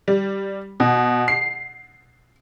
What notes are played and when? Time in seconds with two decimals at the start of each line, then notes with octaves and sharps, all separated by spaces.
0.08 G3
0.80 B2
1.28 C7